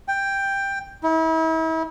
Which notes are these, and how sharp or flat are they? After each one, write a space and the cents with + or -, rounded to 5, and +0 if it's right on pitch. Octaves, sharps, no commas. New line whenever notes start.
G5 +10
E4 -40